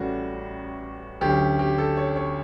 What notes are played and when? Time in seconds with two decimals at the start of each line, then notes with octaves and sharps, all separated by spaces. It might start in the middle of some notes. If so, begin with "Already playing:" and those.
Already playing: A1 A2 G3 C#4 F#4
1.21 D2 D3 F#3 C#4 G4
1.59 G4
1.78 A4
1.97 C#5
2.16 C#5